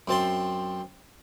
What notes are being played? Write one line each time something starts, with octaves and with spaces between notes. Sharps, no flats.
F#2 C4 A5 C6